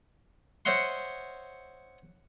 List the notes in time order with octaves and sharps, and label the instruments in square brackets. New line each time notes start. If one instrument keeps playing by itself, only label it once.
[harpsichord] C5 C#5 D#5 E5 F#5 C6